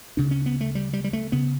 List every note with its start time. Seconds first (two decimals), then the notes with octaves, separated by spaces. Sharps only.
0.17 D2 C#3 D4
0.31 C#4
0.46 B3
0.61 A3
0.75 G3
0.93 G3
1.04 G3
1.13 A3
1.32 C#3 B3